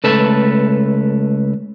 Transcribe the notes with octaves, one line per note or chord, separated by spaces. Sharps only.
C#2 A3 A4 B4 A5